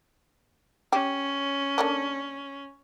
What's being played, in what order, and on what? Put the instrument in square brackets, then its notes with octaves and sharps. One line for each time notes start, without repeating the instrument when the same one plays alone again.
[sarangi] C#4 [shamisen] G4
[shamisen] D3 A#3 D4